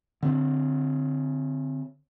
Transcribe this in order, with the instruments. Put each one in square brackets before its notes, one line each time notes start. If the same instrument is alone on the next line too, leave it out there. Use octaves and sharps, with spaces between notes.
[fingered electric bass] D3 C4